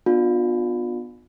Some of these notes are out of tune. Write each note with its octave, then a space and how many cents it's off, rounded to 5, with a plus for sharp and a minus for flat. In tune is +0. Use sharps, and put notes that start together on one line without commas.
B3 +0 D4 +40 F4 +35